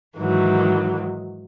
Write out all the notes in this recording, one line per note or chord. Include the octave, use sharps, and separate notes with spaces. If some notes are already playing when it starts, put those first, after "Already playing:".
G#2 D#3 E3 F#3